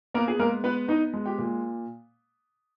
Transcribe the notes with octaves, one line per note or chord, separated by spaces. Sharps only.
A#3 B3 A#4
G#4
G#3 A#3 A#4
B3 B4
B3 D#4 D#5
G#3
G4 G5
A#2